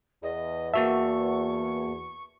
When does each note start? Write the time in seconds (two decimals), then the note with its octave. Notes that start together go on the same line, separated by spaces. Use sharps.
0.23 E2 D#5
0.74 A#3 F#4 E5 A5 C#6